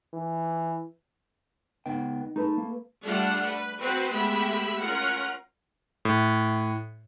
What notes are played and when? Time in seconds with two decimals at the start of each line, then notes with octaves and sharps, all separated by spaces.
0.14 E3
1.86 C#2 B3 D#4 G5
2.36 A3 D#4 A4 B4
2.58 A#3
3.04 G3 A3 D4 F4 F#5
3.44 B4
3.80 C4 F#4 B4 C5
4.11 G#3 A3 B3 G4 E5 B5
4.81 C#4 F4 A#4 F#5
6.05 A2